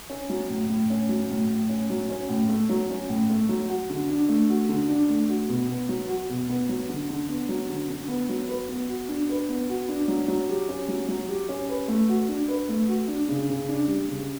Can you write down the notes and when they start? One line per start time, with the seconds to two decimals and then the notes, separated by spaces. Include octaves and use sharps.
0.10 C#4
0.29 F#3
0.49 A2
0.69 A2
0.90 C#4
1.09 F#3
1.30 A2
1.49 A2
1.69 C#4
1.90 F#3
2.10 C#4
2.29 A2
2.49 A3
2.69 F#3
2.90 C#4
3.09 A2
3.30 A3
3.49 F#3
3.69 F#4
3.90 D3
4.09 D4
4.29 A3
4.49 F#4
4.69 D3
4.89 D4
5.09 A3
5.29 F#4
5.49 B2
5.69 B3
5.89 F#3
6.09 F#4
6.29 B2
6.49 B3
6.69 F#3
6.89 D3
7.09 D3
7.29 B3
7.49 F#3
7.69 D3
7.89 D3
8.08 B3
8.29 F#3
8.49 B4
8.69 B3
8.89 F#4
9.09 D4
9.29 B4
9.49 B3
9.69 F#4
9.88 D4
10.08 F#3
10.28 F#3
10.49 G4
10.69 C#4
10.88 F#3
11.09 F#3
11.29 G4
11.49 C#4
11.69 B4
11.88 A3
12.09 F#4
12.29 D4
12.48 B4
12.69 A3
12.88 F#4
13.08 D4
13.28 C#3
13.49 C#3
13.69 D4
13.88 G3
14.08 C#3